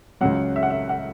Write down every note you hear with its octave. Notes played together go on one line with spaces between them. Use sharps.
C#2 C#3 F#3 F#5
E5
F#5
E5
F#5